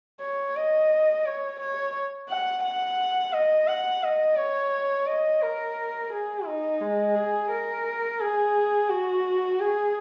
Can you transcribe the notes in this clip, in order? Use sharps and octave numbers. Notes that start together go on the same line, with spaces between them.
C#5
D#5
C#5
C#5
F#5
F#5
D#5
F#5
D#5
C#5
D#5
A#4
G#4
D#4
G#3
G#4
A#4
G#4
F#4
G#4